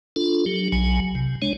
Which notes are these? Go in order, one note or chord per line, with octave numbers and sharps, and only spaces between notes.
D4 F4 A4
F#3 G4
B1 F#3 G#5
C3
G#3 D4 C#5